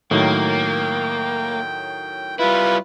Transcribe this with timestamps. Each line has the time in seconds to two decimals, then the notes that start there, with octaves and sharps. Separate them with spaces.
0.11 A2 D#3 F#3 A#3 G5
2.39 G3 E4 F4 B4